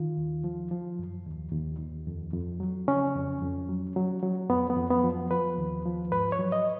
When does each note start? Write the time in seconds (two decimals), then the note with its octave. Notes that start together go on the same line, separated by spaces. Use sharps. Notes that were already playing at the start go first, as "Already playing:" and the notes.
Already playing: D#3 F4
0.17 D#2
0.44 F3
0.71 F3
0.99 F#2
1.26 D#2
1.52 D#2
1.79 D#2
2.07 F2
2.34 F2
2.60 F#3
2.87 C#3 C#4
3.15 F2
3.42 F2
3.69 F#3
3.96 F#3
4.22 F#3
4.49 F2 B3
4.70 B3
4.77 F2
4.90 B3
5.04 F3
5.31 F3 B4
5.58 D#2
5.85 F3
6.11 G#2 B4
6.32 C#5
6.39 F#3
6.52 D#5